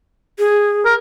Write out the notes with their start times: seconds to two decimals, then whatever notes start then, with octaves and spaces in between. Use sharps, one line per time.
0.39 G#4
0.85 A#4